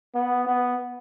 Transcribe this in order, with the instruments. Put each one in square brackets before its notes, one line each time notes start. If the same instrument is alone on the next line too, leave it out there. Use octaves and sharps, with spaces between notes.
[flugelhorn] B3
B3